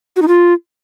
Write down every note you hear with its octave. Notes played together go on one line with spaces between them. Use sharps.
F#4
D#4
F4